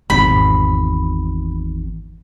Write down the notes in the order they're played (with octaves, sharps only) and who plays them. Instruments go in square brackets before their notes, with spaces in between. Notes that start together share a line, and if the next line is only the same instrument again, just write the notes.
[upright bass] G#1 E2 [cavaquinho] B5